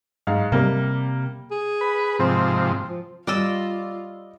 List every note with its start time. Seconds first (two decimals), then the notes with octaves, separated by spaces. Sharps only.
0.27 G#2 F5
0.52 C3 G3 A#3
1.51 G#4
1.81 B4
2.19 G#2 C3 F3 C4
2.89 F3
3.27 G3 F4 D5 D#5 E6